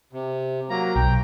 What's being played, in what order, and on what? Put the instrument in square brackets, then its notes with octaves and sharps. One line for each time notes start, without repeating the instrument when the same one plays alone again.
[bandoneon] C3
F#3 A#3 A#5
[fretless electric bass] B1 [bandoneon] G5 A#5